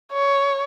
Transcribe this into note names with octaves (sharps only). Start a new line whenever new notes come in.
C#5